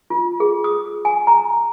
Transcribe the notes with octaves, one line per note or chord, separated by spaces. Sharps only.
F4
G#4
D#6
G#5
A#5